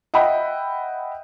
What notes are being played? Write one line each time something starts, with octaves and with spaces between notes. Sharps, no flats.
D#5 E5 F#5 G5 B5